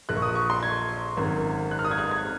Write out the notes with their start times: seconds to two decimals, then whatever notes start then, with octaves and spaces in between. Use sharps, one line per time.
0.09 A#1 A#2 F#6
0.17 C#6
0.22 D#6
0.35 C#6
0.50 C6
0.63 G#6
1.17 G#1 F#2 D#3
1.71 F#6
1.79 F6
1.85 D#6
1.91 G#6
1.98 F#6
2.11 G#6